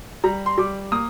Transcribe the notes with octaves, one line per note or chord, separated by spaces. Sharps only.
G3 A#5
C6
G3 D6
A#3 D#6